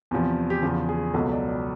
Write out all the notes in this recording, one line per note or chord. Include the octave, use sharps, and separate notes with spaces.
E2 C3 F3
G4
E2 C#3 F3 G#4
G#4
C#2 B2 F#3 A4
D5
D5